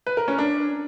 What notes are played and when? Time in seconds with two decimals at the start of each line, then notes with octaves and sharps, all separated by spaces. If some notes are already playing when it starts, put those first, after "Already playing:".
0.07 B4
0.17 A#4
0.28 C#4
0.39 D4